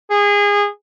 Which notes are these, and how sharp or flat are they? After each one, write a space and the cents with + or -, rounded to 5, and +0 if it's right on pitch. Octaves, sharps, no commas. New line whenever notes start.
G#4 -25